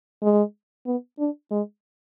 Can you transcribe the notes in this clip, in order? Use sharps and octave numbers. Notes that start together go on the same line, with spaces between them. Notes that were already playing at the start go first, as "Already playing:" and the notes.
G#3
B3
D4
G#3